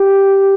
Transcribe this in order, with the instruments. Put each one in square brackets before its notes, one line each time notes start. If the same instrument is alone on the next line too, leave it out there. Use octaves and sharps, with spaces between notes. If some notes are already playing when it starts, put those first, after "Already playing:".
Already playing: [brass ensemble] G4